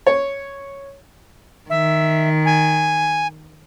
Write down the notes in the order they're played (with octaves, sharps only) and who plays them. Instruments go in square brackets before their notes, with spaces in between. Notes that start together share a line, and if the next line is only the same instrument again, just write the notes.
[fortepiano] C#5
[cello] D#3 [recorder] E5
[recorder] G#5